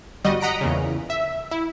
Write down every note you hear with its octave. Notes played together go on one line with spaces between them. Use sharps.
G1 G3 F#4 D#5
D#5 F#5 A#5 B6 D7
E2 A#2 C#3
E5
E4